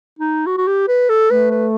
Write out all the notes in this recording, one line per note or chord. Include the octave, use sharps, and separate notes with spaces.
D#4
F#4
F#4
G4
B4
A4
A3 B4
B4